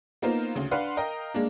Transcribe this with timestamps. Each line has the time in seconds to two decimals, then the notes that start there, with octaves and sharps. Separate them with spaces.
0.22 A#3 B3 D#4 F4 A#4 C5
0.55 D2 C#3
0.71 D4 B4 F5 F#5 C6
0.97 A#4 D#5 F5 G5 A#5
1.34 G#3 A#3 D4